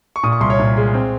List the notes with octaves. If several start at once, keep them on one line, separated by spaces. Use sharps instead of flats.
C#6
A#2 D#6
C#6
C2 C6
C#5
A#2
G#3
C4